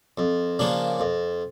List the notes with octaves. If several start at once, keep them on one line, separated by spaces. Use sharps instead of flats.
F2
C#3 F3 A#3 D4
F2